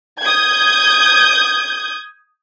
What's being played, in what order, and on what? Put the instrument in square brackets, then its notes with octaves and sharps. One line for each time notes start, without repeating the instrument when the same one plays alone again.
[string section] D#6 G6 G#6